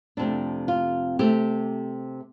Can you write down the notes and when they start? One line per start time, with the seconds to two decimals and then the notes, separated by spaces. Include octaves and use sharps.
0.17 F2 C3 A3 D4
0.68 F4
1.19 C3 A3 G4